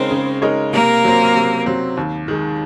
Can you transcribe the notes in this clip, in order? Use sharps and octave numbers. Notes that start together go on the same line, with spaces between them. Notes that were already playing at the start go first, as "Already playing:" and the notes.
Already playing: C#3 G#3 C4 D#4 A#4 C5 C#5
C#3
G#3 D#4 A#4 C#5
C3 A#3 A#4
F#3 C4
C3
F#3 C4
D#2
D#3 G#3